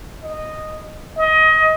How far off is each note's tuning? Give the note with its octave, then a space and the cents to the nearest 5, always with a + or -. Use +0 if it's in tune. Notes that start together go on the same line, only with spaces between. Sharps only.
D#5 -5
D#5 +25